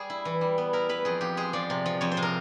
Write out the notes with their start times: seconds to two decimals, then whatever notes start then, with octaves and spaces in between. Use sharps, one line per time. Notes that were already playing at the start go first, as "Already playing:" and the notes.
Already playing: G3 G#4
0.10 E4
0.25 E3
0.41 G3
0.58 B3
0.73 E4 A#4
0.89 E4 B4
1.05 F2 G#4
1.21 F3 G4
1.37 G#3 G#4
1.53 F3 D5
1.70 C3
1.86 F3
2.01 F2 C#5
2.12 C5
2.17 C3
2.22 A#4